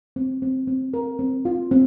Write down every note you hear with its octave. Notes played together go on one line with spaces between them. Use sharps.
C4
C4
C4
A#4
C4
F4
C4